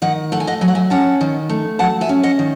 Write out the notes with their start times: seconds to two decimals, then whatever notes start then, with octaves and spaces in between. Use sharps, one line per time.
0.02 D#3 D#5 F#5
0.32 A3 F#5
0.40 G#5
0.47 D#5 F#5
0.61 F#3 G#5
0.68 F#5
0.75 E5 G#5
0.90 C#4 F#5 A5
1.21 D#3
1.49 A3
1.79 F#3 F#5 A5
2.01 E5 G#5
2.09 C#4
2.23 D#5 F#5
2.39 D#3